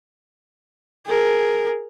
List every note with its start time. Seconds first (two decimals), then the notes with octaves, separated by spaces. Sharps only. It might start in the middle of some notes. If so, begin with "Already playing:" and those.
1.07 G#4 A#4